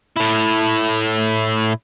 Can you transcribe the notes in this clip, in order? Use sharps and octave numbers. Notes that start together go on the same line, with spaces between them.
A2 E4